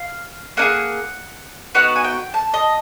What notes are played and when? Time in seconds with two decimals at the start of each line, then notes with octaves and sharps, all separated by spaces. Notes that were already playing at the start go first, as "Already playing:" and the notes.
Already playing: F5
0.57 A#3 D#4 F#5
0.62 G#4
1.75 B3 D#4 F#4 F#5
1.96 G#5
2.04 G5
2.34 A5
2.54 D#5